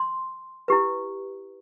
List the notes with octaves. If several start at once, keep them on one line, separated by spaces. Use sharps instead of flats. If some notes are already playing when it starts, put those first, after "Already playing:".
Already playing: C6
E4 G4 B4